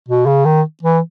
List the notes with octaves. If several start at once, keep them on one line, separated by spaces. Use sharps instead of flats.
B2
C#3
D#3
E3